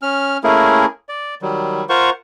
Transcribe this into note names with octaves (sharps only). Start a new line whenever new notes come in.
C#4 F6
A3 A#3 C#4 E4 G#4 A#4
D5
D#3 F#3 G3
F4 A#4 C5 F#5 C#6